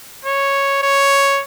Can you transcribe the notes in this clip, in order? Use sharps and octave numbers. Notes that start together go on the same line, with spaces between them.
C#5
C#5